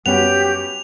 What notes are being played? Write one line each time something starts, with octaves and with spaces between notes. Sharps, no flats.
F#2 G3 B3 C#4 F#4 G4 F7